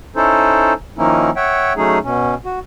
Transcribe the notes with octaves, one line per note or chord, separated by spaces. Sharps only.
C#4 D#4 E4 A4 C5
D#3 F3 A#3 C#4 D#4 E4
C#5 E5 F#5 G5
F#3 A3 C#4 D#4 G#4
B2 C#4
F#4